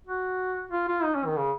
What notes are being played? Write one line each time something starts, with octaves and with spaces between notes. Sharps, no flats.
F#4
F4
F4
D#4
C#4
D#3
C#3